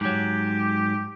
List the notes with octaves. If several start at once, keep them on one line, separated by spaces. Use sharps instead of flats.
G#2 F#3 G4